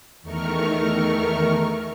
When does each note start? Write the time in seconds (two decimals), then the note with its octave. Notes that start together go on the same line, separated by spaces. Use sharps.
0.22 E2 D#3 A3 A#4 C#6 F6